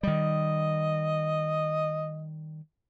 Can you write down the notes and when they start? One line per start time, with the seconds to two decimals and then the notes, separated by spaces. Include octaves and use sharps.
0.03 D#3 G3 D#5